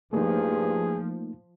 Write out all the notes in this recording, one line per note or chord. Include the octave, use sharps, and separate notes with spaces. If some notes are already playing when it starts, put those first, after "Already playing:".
G2 F3 A3 A#3 D#4 G#4